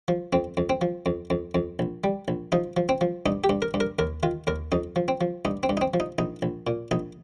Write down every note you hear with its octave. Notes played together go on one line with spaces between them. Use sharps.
F3
F2 C4
F2
C4
F3
F2
F2
F2
A#1
G3
A#1
F3 D#4
F3
C4
F3
G2 D#4
G4
G2
A#4
G2
A#4
D#2 A#4
D#3 F4
D#2 A#4
F2 D#4
F3
C4
F3
G2 D#4
C4
G2
D#4
C4
F3
D#4
A#1 D#4
A#1
A#2
A#1 D#4